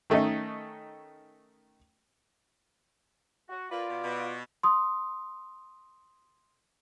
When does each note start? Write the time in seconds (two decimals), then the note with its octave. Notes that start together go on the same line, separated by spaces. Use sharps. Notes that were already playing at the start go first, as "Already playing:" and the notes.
0.10 D#3 A3 C#4 D#4 D#5
3.49 F#4
3.71 A#3 F4 B4 D5
3.88 B2
4.04 B2
4.63 C6 D#6